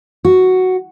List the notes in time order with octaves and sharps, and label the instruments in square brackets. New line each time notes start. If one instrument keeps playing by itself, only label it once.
[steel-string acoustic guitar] F#4